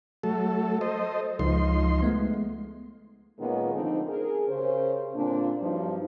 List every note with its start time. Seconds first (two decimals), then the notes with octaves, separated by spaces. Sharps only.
0.24 F#3 A3 A4
0.81 A4 C5 D#5
1.39 C#2 F3 D#4 C6
2.02 G#3 A3 B3
3.39 A#2 D#3 G#3 B3 C#4
3.74 D3 F3 A3 C4 D#4
4.08 G#4 A#4
4.47 C#3 C#4 G4 A#4 C5
5.15 A#2 D3 C4 D4
5.61 G2 F3 F#3 C4 D#4